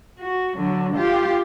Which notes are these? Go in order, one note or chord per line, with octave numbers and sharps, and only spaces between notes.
F#4
D3 F#3
F4 G4